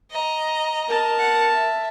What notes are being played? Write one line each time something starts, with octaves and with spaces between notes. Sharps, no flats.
D#5 A#5
A#4 A5
F#5
E5